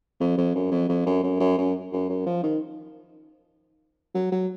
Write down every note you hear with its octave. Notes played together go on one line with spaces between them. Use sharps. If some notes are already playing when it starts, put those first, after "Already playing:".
F2
F2
F#2
F2
F2
F#2
F#2
F#2
F#2
F#2
F#2
F3
D#3
F#3
F#3